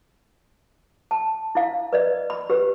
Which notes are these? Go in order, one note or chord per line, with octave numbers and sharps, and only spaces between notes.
A5
E4 F5
B4 D5 D#5
B5
G4 B4